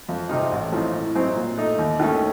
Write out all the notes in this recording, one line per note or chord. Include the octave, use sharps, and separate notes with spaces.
F2
C3 F3 C4 D#4
A1
A2 F3 C4 D#4
A2
F#3 C4 D#4
A#2
A3 D#4
D#2
D#3 A3 C#4